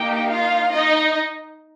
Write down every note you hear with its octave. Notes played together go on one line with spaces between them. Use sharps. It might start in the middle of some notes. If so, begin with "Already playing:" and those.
Already playing: A#3 D#4 G4 G5
F4 F5
D#4 D#5